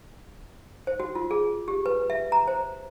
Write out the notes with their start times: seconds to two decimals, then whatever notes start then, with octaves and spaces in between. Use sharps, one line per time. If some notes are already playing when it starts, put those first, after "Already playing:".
0.87 C5
1.00 F#4
1.15 F4
1.31 G#4
1.68 G4
1.86 B4
2.10 E5
2.32 A#5
2.48 C5